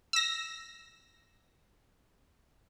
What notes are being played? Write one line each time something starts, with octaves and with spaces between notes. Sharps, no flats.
E6 A#6